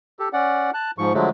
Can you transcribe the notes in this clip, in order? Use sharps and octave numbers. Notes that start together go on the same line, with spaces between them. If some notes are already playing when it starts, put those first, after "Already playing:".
G4 A4
C#4 D5 F#5
A5 F#6
G#2 F3 C#6
D3 F3 F#3 G#3 A3